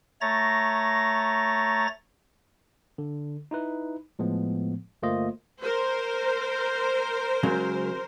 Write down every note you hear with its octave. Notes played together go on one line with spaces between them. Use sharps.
A3 C#5 A#5 A6 A#6
D3
D#4 E4 B4
A2 F3 G#3 B3
G1 A3 A#3 F4 C5 D#5
A#4 C5
C#3 F#3 G#3